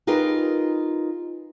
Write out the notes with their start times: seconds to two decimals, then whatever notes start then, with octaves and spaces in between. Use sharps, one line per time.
0.07 D#4 F4 G4 G#4 A#4 B4